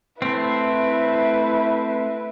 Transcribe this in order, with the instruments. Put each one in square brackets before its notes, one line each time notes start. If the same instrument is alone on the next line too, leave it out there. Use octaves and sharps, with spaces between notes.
[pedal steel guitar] A3 C4 [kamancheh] E4 B4